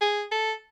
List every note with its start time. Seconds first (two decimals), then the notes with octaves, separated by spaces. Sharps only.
0.01 G#4
0.32 A4